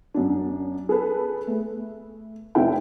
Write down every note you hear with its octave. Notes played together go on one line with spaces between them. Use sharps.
F#2 D4
G#4 A4 B4
A3
F1 C4 D#4 E4 G#4 G5